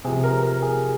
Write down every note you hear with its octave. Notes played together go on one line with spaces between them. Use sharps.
C3 F3 G#4
A#4
A#4
G#4